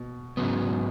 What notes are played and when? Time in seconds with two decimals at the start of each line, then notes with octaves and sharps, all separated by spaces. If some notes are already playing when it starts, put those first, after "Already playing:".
Already playing: B2
0.37 G#2 C#3 F#3 B3